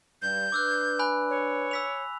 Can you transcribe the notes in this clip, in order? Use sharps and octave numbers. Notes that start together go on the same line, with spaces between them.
G2 G6
D4 B4 D6 E6 F#6
G#5 B5 F#6
C#5
E6 B6 F7